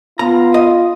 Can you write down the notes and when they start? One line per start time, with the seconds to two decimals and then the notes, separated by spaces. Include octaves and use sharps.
0.19 B3 F4 A#5
0.54 D#5